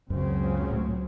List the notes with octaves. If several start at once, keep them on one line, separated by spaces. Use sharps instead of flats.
C#2 F#2 C#3 F#3 C4
A2